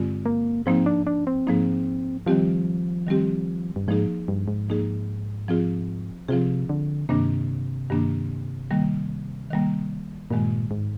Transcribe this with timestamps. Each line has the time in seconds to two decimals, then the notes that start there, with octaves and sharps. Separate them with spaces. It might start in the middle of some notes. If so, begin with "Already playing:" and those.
Already playing: G2 D3 G#3 C4 F4
0.26 A#3
0.66 G#2 F3 A#3 C4 D#4
0.86 D4
1.07 D4
1.27 C4
1.47 G#2 F3 A#3 D#4
2.26 D#3 F3 G3 C4 G4
3.07 D#3 G3 C4 G4
3.76 G2
3.88 G#2 F3 A#3 D#4 G#4
4.28 G2
4.48 G#2
4.69 F3 A#3 D#4 G#4
5.48 F3 C4 F4 G#4
6.28 C3 F3 C4 F4 G#4
6.69 D3
7.09 G2 C3 D#3 A#3 D4
7.90 G2 D#3 A#3 D4
8.71 D#3 G3 A#3
9.51 D#3 G3 A#3
10.31 G2 A#2 D#3 G#3
10.71 G#2